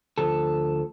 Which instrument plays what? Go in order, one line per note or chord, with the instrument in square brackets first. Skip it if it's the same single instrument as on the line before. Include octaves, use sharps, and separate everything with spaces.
[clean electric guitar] D2 F3 A4